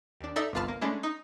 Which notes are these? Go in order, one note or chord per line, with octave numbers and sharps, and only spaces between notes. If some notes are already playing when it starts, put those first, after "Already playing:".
D#2 D4
D#4 A4 D5 E5
G1 C2 F4 B4 A5 F6
A#3
G#3 A3 C#4 D4 E4
D#4